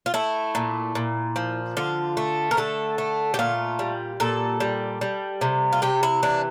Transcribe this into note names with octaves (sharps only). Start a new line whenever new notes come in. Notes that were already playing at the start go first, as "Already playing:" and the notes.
F4
A3 E4
A#2
A#2
F3
D3 F4
A3
A#4
D3 A4
A3
G4
A#2 F4
G3
A#2 A4
G3
G3
C3
F4
C3 G4
E4
E3 D4